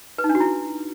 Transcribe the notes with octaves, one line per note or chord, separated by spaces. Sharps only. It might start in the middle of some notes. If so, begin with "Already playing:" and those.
B4
D#4
D4
F#4
E4